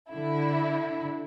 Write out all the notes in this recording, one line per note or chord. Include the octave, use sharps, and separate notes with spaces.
D3 E4